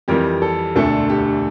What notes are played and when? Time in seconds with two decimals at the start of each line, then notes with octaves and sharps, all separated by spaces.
0.08 F2 E3 G3 G4 A#4
0.42 A4
0.75 E1 D2 D3 A3 A4
1.10 G4